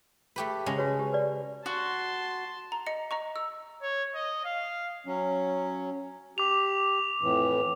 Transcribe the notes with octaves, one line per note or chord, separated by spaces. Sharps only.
A3 G4 B4
C#3 G#3 A#5
F#4 B4 C#5
G4
B4 D5
F#4 A5 C6
A#5
D#5 C#7
D#5 A#5 C#6
E6
C#5
D#5
F5
F#3 C#4
G4 D6 F7
F2 A2 E3